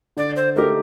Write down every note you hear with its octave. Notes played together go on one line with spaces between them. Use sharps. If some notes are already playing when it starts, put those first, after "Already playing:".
D3 D5
C5
A3 D#4 G4 A#4